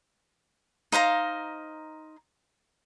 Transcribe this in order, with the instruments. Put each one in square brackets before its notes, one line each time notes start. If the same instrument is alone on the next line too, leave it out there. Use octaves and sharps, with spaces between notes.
[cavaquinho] D#4 C5 F5 A#5